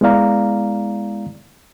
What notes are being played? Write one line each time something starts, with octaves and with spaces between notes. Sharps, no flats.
G#3 B3 E4 D5 F5 A#5